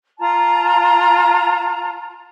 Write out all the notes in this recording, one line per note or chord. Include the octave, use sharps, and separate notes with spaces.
F4 A5 A#5